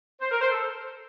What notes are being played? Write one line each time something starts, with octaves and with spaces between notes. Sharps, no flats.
C5
A#4
C5
A4